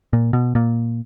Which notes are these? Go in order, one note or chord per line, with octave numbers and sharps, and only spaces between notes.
A#2
B2
A#2